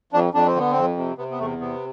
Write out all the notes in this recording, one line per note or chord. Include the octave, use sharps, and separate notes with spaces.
F2 D4
F2 D4
C4
D3 B3
F2 C4
C3
C3 B3
B3
E2 A3
C3 B3